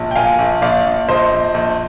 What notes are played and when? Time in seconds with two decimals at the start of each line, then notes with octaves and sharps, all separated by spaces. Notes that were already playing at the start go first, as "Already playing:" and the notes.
Already playing: A#1
0.11 G5
0.16 A#2 F5 G#5
0.38 A#1
0.62 A#1 D5 F5
0.85 A#1
1.08 A#1 C5 D#5
1.31 A#1
1.54 A#1